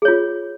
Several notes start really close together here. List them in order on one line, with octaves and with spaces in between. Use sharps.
G#4 C#5 F4